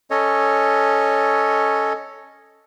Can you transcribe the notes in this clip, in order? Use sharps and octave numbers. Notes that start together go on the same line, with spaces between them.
C#4 A4 C#5 D#5